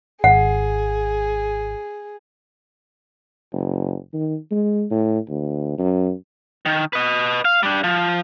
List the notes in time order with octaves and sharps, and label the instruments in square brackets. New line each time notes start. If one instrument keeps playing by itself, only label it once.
[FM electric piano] G#1 [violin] G#4 [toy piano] F#5
[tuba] F#1
D#3
G#3
A2
D2
F#2
[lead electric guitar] D#3
B4 D#5
F5
G3 D4
F3